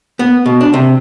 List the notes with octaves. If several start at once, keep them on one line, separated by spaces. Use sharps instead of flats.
B3
B2
D4
C3